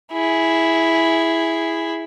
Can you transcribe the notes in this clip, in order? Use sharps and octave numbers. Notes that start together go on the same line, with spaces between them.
E4 G#4